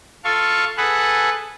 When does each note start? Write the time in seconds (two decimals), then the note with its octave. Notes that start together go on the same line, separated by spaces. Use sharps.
0.24 F4 A4 F5 C#6
0.78 G#4 A4 B4 F#5